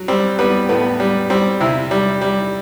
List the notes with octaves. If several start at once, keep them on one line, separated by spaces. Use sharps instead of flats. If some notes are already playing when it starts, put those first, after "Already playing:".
Already playing: F#3
G3 C4
G3 B3
A2 B3
G3
G3 C4
C3 C4 E4
G3
G3